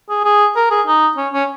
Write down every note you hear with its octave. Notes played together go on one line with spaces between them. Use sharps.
G#4
G#4
A#4
G#4
D#4
C#4
C#4